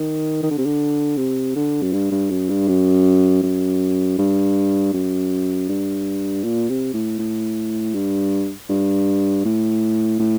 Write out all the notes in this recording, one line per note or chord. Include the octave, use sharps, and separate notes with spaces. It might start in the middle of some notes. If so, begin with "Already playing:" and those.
Already playing: D#3
D#3
D3
C3
D3
C3
D3
F#2
G2
G2
F#2
G2
F#2
F#2
G2
F#2
G2
A#2
C3
A2
A2
G2
G2
A2
A2